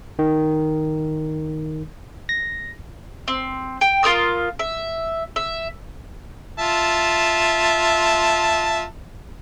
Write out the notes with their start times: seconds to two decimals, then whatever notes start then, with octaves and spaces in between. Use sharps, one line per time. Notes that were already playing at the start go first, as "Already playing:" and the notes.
0.19 D#3
2.29 A#6
3.28 C4
3.81 G5
4.03 F4 A#4 D#6 E6
4.59 E5
5.36 E5
6.59 F4 E5 A5